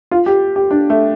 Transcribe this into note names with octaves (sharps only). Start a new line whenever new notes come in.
F4
G4
G4
D4
A3